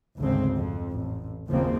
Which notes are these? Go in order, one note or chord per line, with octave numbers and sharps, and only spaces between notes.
G#1 D2 C#3 C4
F2
A1
F#1 D#2 C#3 F3 A#3 C4